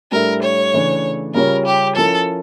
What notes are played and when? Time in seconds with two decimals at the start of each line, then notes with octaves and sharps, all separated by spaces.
0.11 A2 G3 D4 A4 A#4 E5
0.42 C#5
0.74 C#3 E3 A3 D4
1.34 C#3 G3 C#4 F4 A#4 C#5
1.66 G4
1.96 F3 C#4 E4 A4 A#4